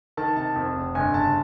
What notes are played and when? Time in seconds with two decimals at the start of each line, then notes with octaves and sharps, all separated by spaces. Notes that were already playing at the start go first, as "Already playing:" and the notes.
0.17 D#3 A5
0.36 C3 A5
0.56 F2
0.76 F1
0.95 G1 G#5
1.14 C#3 A5